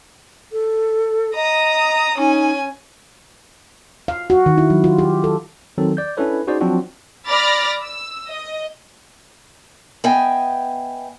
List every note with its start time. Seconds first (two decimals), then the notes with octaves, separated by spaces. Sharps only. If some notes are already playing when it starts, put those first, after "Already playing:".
0.52 A4
1.35 D#5 A#5 D#6
2.18 C#4 D#4 G#5
4.08 F5
4.30 F#4
4.46 D#3
4.58 E4
4.70 F#3
4.84 F4
4.99 G4
5.24 A4
5.78 D#3 F#3 C4 A4
5.97 D5 G6
6.17 C#4 D4 E4 A4 B4 C#5
6.47 C#4 D#4 F#4 G#4 C5 D5
6.61 F3 F#3 C4 D4 F4 F#4
7.27 D5 B5 D6 F6 A6 A#6
7.82 E6
8.27 D#5
10.04 B3 D#5 E5 G5 G#5